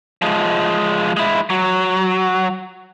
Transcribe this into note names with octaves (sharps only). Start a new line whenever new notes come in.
F3 G#3
G#3 E4
F#3